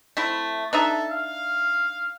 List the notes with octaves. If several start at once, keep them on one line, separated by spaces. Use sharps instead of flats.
A3 C4 E4
D4 D#4 A4 E5
F5